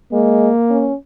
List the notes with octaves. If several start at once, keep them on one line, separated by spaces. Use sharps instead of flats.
G#3 A#3
C#4